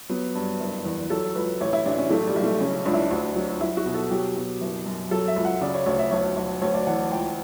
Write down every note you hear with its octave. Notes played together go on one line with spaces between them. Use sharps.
F#3 B3
G2
F#1
E2
F#3 A4
C#2 B4
A1 C#5
E4
A1 D4
C#4
B1 A3
G3
B1
A3
C#3 C#4
C#2 D4
E4
D4
D2
F#3
F#3 E4
F#4
B2
A4
F#3 G4
B2
F#1
F#2
F#3 A4
E5
C#2
F#5
C#3 D5
C#5
D2 C#5
E5
B1 C#5
B1
D2 C#5
D5
E3 F#5
C#2 G5